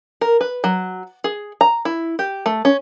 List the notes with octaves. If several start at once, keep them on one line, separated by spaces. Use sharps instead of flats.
A#4
B4
F#3
G#4
A#5
E4
G4
A3
C#4